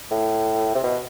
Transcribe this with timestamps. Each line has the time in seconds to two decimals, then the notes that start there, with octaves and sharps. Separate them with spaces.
0.11 A2
0.75 C3
0.83 B2